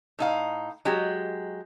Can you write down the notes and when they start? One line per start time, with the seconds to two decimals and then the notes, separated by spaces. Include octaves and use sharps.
0.19 A2 D#4 F5
0.85 F#3 G#3 G4